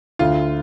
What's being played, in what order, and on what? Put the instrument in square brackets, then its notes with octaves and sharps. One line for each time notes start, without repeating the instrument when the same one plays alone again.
[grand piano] D2 [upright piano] F4